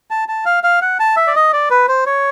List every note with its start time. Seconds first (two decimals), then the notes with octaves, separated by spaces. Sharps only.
0.11 A5
0.28 A5
0.45 F5
0.64 F5
0.82 F#5
1.00 A5
1.17 E5
1.27 D5
1.36 D#5
1.53 D5
1.70 B4
1.88 C5
2.06 C#5